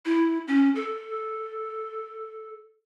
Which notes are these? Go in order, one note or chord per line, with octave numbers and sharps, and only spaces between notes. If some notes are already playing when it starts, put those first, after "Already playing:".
E4
C#4
A4